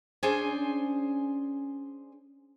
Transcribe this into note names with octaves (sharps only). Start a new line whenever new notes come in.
C#4 D4 G#4 C5 G#5